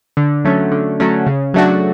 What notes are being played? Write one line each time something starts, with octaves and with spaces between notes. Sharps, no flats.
D3
F#3 A3 C#4
D3
F#3 A3 C#4
C#3
F#3 A3 D4 F#4